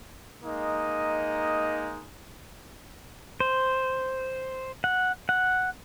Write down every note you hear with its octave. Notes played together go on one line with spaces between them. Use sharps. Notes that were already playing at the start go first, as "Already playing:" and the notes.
G#3 A#3 D#4 D#5
C5
F#5
F#5